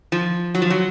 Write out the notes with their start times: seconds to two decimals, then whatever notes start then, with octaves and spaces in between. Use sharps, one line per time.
0.12 F3
0.55 F#3
0.62 F3
0.70 F#3